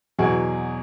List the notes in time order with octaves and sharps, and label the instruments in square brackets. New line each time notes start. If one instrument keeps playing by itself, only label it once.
[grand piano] E2 B2 F#3 G#4